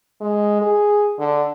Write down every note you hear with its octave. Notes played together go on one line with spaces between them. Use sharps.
G#3
G#4
D3